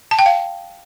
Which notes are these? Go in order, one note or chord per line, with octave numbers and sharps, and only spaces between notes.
A5
G5
F5